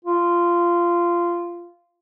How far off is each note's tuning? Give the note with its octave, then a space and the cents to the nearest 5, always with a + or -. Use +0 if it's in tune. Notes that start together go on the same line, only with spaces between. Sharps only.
F4 -15